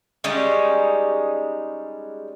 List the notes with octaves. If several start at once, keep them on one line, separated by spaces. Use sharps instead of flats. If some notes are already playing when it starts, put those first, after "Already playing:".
G3 G#3 C#4 D#4